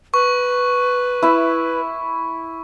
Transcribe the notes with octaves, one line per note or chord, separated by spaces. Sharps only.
B4 C#6
E4 E5